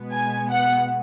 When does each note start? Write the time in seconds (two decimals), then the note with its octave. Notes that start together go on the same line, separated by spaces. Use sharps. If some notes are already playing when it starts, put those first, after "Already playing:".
Already playing: B2 G#3 B3
0.13 G#5
0.51 F#5